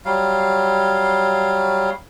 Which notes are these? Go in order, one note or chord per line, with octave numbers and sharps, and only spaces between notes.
F#3 G3 F5